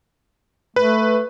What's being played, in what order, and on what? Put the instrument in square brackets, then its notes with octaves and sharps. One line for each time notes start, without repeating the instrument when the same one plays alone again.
[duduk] A3 [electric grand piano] B4